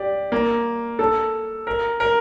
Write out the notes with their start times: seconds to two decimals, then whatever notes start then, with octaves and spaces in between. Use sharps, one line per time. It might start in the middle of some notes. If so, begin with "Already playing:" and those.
Already playing: G4 D5
0.32 A#3
0.99 A4
1.67 A#4
2.00 A#4